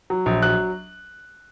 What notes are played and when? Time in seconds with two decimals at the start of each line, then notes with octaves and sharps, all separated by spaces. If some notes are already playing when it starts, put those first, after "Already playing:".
0.10 F#3
0.26 A#1
0.43 F#3 F#6